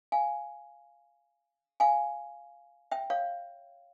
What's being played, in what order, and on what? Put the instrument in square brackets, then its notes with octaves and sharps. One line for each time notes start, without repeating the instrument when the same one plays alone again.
[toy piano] F5 G#5
F5 G#5
E5 G5
C#5 F5